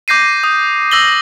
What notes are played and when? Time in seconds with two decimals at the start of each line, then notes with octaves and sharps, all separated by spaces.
0.08 D6 G6 A#6 C7 D#7
0.44 D#6
0.92 D6 E6 A#6 F#7 G7